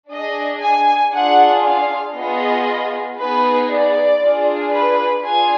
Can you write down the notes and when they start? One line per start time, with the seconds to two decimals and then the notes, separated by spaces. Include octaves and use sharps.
0.10 D4 G#4 D#5
0.62 G#5
1.13 D4 F4 G#4 F#5
1.64 F5
2.16 B3 F4 G#4 D#5
3.18 B3 D#4 G#4 B4
3.70 D5
4.21 D4 F4 G#4
4.72 B4
5.24 D4 F4 G#4 G#5